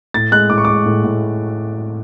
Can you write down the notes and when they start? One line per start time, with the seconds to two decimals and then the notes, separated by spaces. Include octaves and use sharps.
0.14 A2 A6
0.32 G#3 F#6
0.50 A2 D6
0.58 C#6
0.65 G#3 D6
0.86 A2
1.04 A2